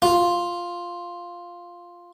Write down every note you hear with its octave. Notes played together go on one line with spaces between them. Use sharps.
F4